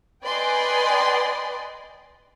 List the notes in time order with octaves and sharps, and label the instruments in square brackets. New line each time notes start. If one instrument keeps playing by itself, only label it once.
[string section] B4 D5 D#5 G5 G#5 C6